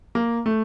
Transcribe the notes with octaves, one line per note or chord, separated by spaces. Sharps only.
A#3
A3